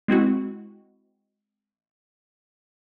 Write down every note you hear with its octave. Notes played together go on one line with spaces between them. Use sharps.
G#3 C4 E4 F#4